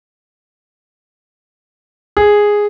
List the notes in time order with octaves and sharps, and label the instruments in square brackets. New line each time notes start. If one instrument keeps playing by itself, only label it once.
[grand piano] G#4